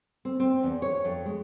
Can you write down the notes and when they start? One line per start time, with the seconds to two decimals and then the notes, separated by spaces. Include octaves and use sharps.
0.25 C4
0.40 C4
0.63 E2
0.82 C#5
1.04 F2
1.25 G#3